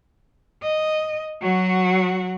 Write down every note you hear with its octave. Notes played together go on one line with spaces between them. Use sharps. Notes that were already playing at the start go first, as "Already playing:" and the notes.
D#5
F#3 F#4